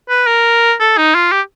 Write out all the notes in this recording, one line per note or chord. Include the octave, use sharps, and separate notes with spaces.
B4
A#4
A4
D#4
F4
G4